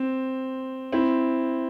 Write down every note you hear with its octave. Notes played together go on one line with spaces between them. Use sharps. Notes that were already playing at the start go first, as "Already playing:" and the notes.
Already playing: C4
C4 E4